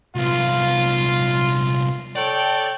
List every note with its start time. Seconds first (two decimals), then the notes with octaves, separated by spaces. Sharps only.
0.15 C2 B3 F4
2.16 A4 C#5 D5 G5